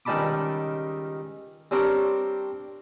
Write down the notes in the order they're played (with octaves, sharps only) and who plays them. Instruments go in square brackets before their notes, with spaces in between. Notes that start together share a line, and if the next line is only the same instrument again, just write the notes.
[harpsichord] C#2 D#3 G3 A5 B5 D6
G3 C4 D4 A#4 C#5